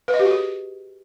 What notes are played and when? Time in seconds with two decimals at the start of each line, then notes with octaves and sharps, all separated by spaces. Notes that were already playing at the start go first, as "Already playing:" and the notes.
0.08 B4
0.14 D#5
0.19 G4
0.25 F#4
0.31 G#4